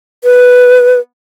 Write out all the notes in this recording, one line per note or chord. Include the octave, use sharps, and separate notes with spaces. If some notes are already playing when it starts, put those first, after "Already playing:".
B4